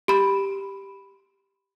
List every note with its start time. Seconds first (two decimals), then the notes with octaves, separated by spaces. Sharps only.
0.08 G4 B5